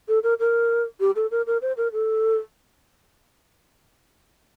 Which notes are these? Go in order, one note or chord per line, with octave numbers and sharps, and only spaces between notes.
A4
A#4
A#4
G4
A4
A#4
A#4
C5
A#4
A4